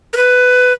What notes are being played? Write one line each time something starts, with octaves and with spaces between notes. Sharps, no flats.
A#4
B4